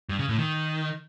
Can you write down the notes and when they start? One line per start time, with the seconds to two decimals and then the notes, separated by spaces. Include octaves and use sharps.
0.09 G2
0.19 C#3
0.29 A2
0.39 D#3